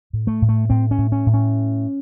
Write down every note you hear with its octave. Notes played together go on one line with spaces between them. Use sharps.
A2
A3
A2
A3
A2 C4
C#4
A2
C#4
A2
C#4